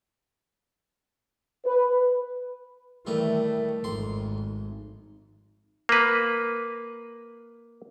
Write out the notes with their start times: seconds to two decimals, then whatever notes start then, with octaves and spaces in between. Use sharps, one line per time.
1.65 B4
3.07 D#3 E3 G3 A3
3.84 G#1 F2 C6
5.89 A#3 B4